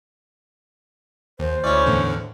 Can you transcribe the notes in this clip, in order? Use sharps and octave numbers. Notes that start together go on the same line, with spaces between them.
D#2 C5
D2 C#4 E4 C#5 D5
E2 A2 D3